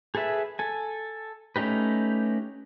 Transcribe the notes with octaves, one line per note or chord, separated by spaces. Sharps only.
G#4 A4 B4 E5
A4 G#5
A3 C#4 D#4 G4 B4